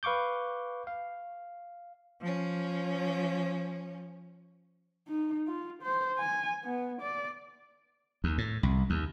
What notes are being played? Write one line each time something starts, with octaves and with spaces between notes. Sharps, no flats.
B4 F5 C#6 D6 G6
F5
F3 C#4
D#4
F4
C5
G#5
B3
D5
D#2
A2
C2
D#2